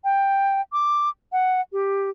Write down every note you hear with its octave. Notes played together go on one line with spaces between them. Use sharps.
G5
D6
F#5
G4